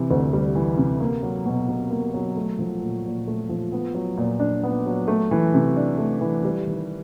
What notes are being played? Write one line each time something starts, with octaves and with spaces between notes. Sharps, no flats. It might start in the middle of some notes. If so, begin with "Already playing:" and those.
Already playing: C3 E3
D2
G3
E3
C3
A#3
F#3
B2
B2
A#3
F#3
A3
F3
A#2
A#2
A3
F3
B3
F#3
A#2
D4
B3
F#3
A3
E3
C3
D4
A3
E3
G3
D#3